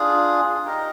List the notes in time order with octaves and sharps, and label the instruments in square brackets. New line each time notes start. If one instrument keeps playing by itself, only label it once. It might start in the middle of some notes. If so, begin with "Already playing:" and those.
Already playing: [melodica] D4 F4 G#4
D#4 G4 A#4 D#5